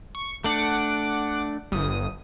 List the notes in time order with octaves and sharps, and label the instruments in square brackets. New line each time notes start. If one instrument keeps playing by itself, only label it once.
[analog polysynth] C#6
[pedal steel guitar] A3 D4 [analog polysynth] F#5 D6
[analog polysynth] G1 D#6